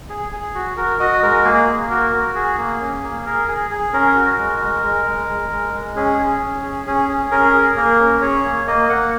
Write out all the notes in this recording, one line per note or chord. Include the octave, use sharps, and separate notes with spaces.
G#4
G#4
F#4
F#4 A#4
F#4 D#5
G#3 A#4
A#3 G#4
A#3
F#4 A#4
F#4
G#4
A#3
C#4
A#3
G#4 A#4
G#4
G#4
C#4 A#4
F#4
G#3
G#3
G#3
G#3
G#3
G#3
G#3
C#4 G#4
G#4
C#4
G#4
C#4 G#4
G#4
C#4 A#4
G#4
A#3 A#4
C#4
G#4 C#5
A#3
A#3 D#5
A#3 F#5